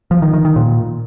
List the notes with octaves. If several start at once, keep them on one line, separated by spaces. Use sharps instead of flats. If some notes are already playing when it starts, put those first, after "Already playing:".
F3
D#3
D#3
D#3
A#2